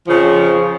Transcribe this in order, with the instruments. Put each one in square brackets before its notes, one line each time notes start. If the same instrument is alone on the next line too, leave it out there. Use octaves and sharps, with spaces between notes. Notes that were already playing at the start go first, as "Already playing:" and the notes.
[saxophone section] F2 C#3 F3